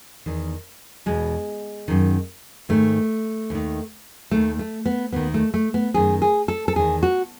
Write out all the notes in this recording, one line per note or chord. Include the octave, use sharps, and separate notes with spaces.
E2 D#3
E2 B2 G#3
F#2 D#3
G#2 D#3 A3
D#2 D#3
D#2 D#3 A3
A3
B3
D#2 D#3 B3
A3
A3
B3
F#2 D#3 G#4
G#4
A4
A4
E2 D#3 G#4
F#4